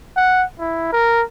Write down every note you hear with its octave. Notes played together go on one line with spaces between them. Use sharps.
F#5
E4
A#4